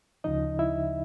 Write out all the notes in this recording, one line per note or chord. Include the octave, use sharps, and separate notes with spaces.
D2 C#3 F3 D#4 D#5
E4 E5